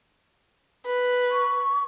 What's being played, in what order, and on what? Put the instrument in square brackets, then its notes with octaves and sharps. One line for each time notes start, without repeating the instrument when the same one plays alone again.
[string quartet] B4
[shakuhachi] C#6